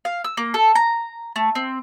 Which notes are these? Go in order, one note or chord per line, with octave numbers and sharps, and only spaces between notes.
F5
E6
A#3
A4
A#5
A3
C4